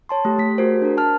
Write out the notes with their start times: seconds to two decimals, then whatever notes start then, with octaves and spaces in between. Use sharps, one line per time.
0.09 C#5 A5 C6
0.25 A3 G4
0.38 A3 B6
0.58 F#4 G#4 A#4 C5
0.82 D4 A#4
0.97 A5 F6